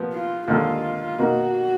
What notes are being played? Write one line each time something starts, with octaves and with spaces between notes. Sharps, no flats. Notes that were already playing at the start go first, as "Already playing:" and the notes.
Already playing: A#2 F3 B3
F4
D#2 D3 G#3 F4
B2 A#3 D#4 F#4